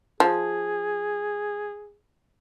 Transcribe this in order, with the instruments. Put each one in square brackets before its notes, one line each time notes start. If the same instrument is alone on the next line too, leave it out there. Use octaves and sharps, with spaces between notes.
[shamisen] F3 [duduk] G#4